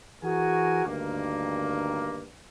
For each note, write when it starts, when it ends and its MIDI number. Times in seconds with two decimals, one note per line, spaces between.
0.22 0.85 52
0.22 0.85 66
0.22 0.85 68
0.22 0.85 70
0.22 0.85 80
0.86 2.26 38
0.86 2.26 43
0.86 2.26 51
0.86 2.26 58